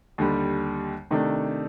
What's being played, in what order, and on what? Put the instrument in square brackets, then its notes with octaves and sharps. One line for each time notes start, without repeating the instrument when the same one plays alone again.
[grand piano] D#2 D3 G3
C3 D#3 A3 D4